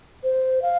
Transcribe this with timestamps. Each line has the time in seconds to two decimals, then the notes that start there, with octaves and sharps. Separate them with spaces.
0.23 C5
0.62 F5